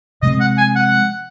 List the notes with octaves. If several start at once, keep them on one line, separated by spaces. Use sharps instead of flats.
C3 F3 G#3 C4 D#5
F#5
G#5
F#5